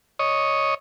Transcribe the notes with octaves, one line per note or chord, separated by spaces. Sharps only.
C#5 D#5